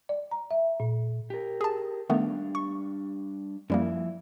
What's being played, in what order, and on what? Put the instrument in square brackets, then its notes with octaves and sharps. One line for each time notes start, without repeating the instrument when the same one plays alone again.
[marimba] D5
A#5
E5
A#2
[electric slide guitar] G4 A#4
[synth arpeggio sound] G#4 A5
[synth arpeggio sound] D#3 A3 B3 [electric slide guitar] G3 D4 F5
[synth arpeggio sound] C#6
[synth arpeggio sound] F#2 G3 A#3 [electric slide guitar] F3 E4